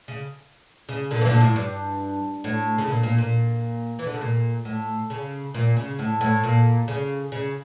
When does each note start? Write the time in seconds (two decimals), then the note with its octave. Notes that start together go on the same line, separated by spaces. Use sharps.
0.08 C#3
0.89 C#3
1.11 A#2 D3
1.21 E3
1.25 A#2 D3
1.41 A2
1.56 G2
2.44 A2
2.78 C#3
2.88 A#2
3.03 A#2
3.18 A#2
3.99 E3
4.06 D3
4.14 C#3
4.21 A#2
4.65 A2
5.10 C#3
5.54 A#2
5.77 C#3
5.99 A2
6.21 A2
6.44 A#2
6.88 C#3
7.32 C#3